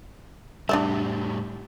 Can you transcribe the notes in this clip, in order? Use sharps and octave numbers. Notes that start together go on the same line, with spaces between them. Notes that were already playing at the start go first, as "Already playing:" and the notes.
A2 G3 D4 D5 E5